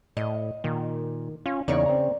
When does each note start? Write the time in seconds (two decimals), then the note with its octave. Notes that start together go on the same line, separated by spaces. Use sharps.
0.17 A2 D#5
0.64 A#2 D#3
1.46 C#4 F4
1.68 E2 C#3 A#3 D#4 A#4 C#5 D5
1.86 C4 A#5